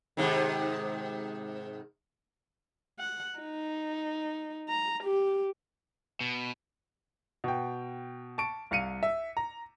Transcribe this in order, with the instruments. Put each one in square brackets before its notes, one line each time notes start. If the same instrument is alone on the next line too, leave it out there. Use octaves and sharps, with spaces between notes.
[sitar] G#2 C3 D#3
[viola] F#5
D#4
A#5
G4
[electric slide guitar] B2
[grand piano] B2 G5
A5 C#6 D7
C2 F5 C#7 D#7
E5
A#5